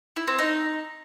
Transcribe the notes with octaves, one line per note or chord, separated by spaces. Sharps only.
E4
C4
D#4